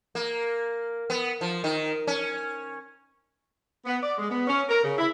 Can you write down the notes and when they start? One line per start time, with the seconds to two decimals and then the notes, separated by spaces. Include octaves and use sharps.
0.15 A#3
1.10 B3
1.41 F3
1.64 D#3
2.07 C#4
3.86 B3
4.02 D5
4.18 G#3
4.30 B3
4.47 C#4
4.69 A#4
4.83 C#3
4.98 E4